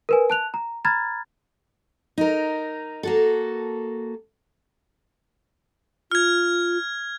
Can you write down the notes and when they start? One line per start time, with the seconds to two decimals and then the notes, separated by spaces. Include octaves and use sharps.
0.09 A#4 B4 G#5
0.30 A5 F#6 F7
0.54 A#5
0.85 A#5 B5 F6 G#6 A6
2.18 D#4 A#4
3.03 A#3 F#4 A4
6.11 F4 F6 G#6